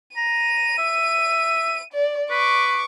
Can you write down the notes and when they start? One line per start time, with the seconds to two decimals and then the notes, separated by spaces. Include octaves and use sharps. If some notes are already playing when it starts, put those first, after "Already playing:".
0.17 A#5 D#7
0.78 E5
1.93 D5
2.31 B4 C#6 D6